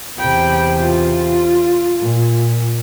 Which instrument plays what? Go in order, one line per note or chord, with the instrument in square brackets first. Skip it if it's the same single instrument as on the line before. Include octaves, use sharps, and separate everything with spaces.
[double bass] E2 C3 [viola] G5 B5
[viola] F4
[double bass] A#2